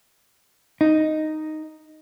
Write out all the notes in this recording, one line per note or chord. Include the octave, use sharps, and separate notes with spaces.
D#4